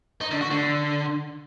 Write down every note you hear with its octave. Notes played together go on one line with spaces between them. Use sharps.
D#4
D3
F#4
D3